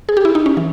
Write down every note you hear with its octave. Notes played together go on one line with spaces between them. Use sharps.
G#4
G4
E4
D#4
C#4
E3